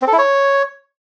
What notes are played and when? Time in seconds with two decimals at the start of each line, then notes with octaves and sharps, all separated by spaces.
0.02 C4
0.07 A4
0.13 E4
0.18 C#5